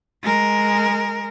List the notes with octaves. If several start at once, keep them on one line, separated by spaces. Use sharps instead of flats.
G#3 A#4